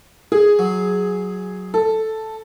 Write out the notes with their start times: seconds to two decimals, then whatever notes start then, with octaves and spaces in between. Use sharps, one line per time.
0.32 G#4
0.59 F#3
1.74 A4